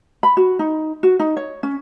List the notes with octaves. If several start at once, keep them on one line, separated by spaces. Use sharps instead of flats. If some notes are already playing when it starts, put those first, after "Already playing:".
B5
F#4
D#4
F#4
D#4
C#5
C#4